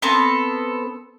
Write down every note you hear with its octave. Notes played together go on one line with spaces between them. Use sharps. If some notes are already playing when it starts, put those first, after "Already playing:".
B3 C4 A4